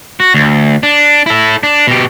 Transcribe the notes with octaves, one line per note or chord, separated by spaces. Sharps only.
F#4
D2
D4
E4 A4
D4
B2 G4